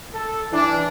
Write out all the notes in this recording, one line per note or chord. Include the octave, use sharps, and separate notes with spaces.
A4
E3 D4